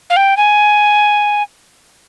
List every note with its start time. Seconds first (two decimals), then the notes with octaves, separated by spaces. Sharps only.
0.10 F5
0.16 G5
0.37 G#5